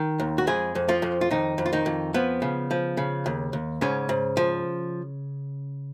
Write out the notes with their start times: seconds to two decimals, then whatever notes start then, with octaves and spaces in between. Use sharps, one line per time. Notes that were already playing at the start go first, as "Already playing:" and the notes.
Already playing: D#3
0.20 D#2
0.38 F#4
0.47 F2 G#3 G#4
0.75 F2
0.88 F3 F4
1.02 F2
1.21 F4
1.30 F2 D#3 D#4
1.58 F2
1.66 F4
1.73 D#3 D#4
1.86 F2
2.14 F3 B3
2.42 C#3
2.71 F3
2.97 C#3
3.26 D#2
3.53 D#2
3.81 G#2 C#3 C#4
4.09 G#2
4.37 F3